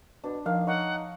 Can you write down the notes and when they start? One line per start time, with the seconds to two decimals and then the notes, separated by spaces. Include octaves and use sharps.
0.24 B2 D4
0.46 D#3 F3 F5
0.67 D#4 C#5 F#5